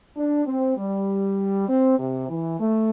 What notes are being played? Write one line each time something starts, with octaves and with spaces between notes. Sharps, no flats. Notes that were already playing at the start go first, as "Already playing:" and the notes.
D4
C4
G3
C4
C3
E3
A3